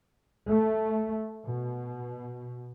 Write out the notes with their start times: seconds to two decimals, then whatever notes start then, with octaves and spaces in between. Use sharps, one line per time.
0.49 A3
1.46 B2